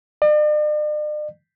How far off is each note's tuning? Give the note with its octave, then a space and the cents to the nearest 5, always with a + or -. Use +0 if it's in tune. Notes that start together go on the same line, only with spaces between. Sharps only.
D5 +45